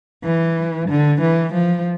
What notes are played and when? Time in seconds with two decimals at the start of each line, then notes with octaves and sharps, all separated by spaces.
0.24 E3
0.89 D3
1.22 E3
1.54 F3